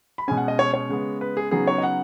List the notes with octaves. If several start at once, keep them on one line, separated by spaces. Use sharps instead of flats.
B5
B2 G#3 C#4 G#5
F#5
D#5
C#5
C#5
C#3 G#3 B3
B4
G#4
C#3 F#3 B3 D#4 G#4
C#5
D#5
F#5